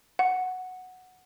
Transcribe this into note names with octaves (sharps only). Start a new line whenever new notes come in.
F#5